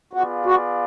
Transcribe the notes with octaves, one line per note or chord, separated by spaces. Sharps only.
B3 F4 F#4 G#4 D5 F5
F#4